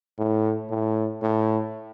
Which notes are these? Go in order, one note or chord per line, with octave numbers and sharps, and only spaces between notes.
A2
A2
A2